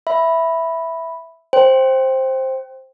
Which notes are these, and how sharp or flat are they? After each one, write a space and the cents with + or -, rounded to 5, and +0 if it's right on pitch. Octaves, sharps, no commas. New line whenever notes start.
E5 +0 B5 +0
C5 +10 G5 +0